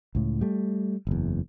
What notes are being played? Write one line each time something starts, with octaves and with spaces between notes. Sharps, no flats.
C#2 A2
G3 A3
F#1 E2